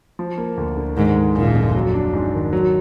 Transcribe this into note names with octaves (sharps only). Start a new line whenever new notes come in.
F3
A#3
D2
D3
G#2 D#3
G#3
F#1 A#2
F2
F#3
D4
G#2
D#3
F#3